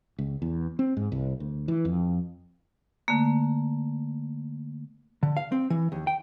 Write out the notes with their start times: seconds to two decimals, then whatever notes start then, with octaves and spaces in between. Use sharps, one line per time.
0.19 C#2
0.42 E2
0.79 C4
0.97 G#2
1.12 C2
1.40 D2
1.68 E3
1.85 F2
3.08 D3 A3 A#3
5.23 D3
5.37 F5
5.52 C4
5.70 E3
5.92 D#2
6.07 G5